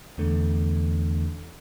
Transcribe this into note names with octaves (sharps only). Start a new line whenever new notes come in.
E2 D3 A3